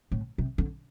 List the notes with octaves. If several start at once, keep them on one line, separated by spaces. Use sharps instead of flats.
A2
C3
D3